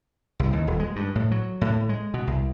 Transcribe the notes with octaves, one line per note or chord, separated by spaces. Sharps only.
C2
D#2
D#1
G#3
G2
A2
F#3
A2
G#3
B2
C2